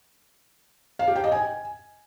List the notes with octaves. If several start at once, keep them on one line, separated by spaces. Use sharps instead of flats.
F5
G4
G5
D#5
G#5